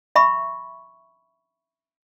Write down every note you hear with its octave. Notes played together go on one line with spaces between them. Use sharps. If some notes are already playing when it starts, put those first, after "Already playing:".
E5 B5 C#6